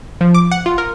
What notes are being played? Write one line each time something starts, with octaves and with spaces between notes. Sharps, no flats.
F3
D6
F#5
F4
A#4